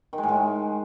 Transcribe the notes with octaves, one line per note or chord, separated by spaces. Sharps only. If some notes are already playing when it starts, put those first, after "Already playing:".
D#3
G#3
A2
G#3